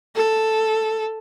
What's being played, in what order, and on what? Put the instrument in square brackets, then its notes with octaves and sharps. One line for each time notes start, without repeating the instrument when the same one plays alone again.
[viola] A4